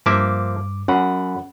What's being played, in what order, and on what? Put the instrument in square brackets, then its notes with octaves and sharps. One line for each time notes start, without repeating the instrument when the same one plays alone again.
[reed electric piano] G2 D6 [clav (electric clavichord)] F3 A#3 E5
[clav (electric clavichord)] F#2 [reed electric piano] C#4 F#5 B5